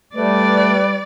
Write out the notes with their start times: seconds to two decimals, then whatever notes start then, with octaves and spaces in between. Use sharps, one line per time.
0.15 G3 A3 B4 D5